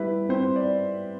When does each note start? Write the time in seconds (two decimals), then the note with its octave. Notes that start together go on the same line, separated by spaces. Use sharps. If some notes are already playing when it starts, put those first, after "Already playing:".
Already playing: G3 E4 G4 B4
0.29 C4 C5
0.56 D5